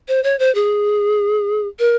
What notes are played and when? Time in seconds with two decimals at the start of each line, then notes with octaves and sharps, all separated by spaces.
0.08 C5
0.24 C#5
0.39 C5
0.55 G#4
1.79 A#4